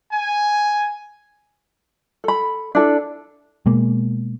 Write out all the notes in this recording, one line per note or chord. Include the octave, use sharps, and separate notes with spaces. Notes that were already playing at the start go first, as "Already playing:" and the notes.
G#5
A4 B5
D4 E4 A4
B2 G#3 A#3